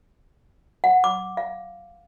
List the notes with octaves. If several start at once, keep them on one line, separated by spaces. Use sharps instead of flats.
F#5
D6
F5